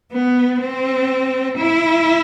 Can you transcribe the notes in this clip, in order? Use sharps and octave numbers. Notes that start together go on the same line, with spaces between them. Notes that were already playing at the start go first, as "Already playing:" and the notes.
B3
C4
E4